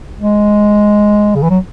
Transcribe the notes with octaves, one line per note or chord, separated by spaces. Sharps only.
G#3
C#3
E3
F#3